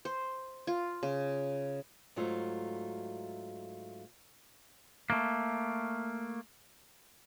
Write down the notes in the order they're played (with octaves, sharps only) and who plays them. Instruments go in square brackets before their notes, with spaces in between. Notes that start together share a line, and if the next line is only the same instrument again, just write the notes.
[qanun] C5
F4
C#3
[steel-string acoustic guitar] G#2 F#3 A3 F4
[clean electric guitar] A3 A#3